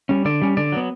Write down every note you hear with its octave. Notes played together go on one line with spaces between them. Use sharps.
G3 C#4
D3 D5
G3 C#4
D3 D5
F#3 B3